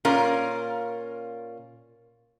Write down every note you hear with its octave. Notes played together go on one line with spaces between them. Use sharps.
A#2 C#4 F4 A#4